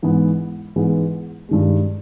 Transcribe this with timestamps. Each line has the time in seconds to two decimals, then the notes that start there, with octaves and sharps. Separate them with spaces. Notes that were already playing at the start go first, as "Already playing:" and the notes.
0.03 G#2 E3 G#3 B3
0.76 G#2 E3 G#3 B3
1.49 G2 D#3 G#3